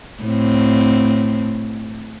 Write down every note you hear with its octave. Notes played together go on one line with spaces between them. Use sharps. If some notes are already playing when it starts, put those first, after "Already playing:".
A2 C4